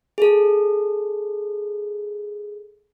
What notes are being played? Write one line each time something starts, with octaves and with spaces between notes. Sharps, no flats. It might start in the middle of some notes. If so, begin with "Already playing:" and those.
G#4 A4